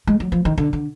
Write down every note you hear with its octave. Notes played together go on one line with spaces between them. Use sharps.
G#3
F#3
F3
D#3
D3
D3